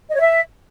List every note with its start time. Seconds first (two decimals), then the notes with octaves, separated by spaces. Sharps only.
0.09 D#5
0.15 C#5
0.20 E5